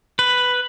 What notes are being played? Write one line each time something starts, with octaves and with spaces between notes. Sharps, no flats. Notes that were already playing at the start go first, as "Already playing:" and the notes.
B4